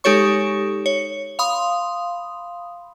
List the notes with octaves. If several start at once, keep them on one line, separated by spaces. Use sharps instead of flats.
G#3 D#4 G4 A4 C#5 C#6
C#5
F5 B5 C6 D#6